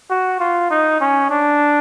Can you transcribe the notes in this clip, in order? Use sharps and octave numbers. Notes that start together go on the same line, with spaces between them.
F#4
F4
D#4
C#4
D4